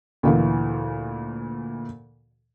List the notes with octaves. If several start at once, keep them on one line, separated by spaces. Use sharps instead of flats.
D2 A#2 E3